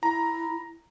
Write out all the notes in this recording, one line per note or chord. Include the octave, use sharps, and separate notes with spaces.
E4 A#5